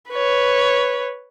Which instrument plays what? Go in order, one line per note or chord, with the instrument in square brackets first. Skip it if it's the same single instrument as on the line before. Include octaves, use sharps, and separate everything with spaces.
[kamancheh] B4 C#5